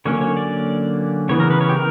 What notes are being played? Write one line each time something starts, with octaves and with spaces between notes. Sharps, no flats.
D3 F#3 A#3 C#4 C#5
C#5
D5
C#3 E3 B3 C#5
A#4
B4
C#5
G4
A#4